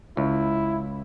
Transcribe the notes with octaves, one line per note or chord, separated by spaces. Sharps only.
C#2 E4